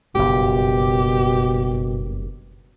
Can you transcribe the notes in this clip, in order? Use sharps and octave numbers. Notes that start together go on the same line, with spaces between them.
F#1 G2 B2 G4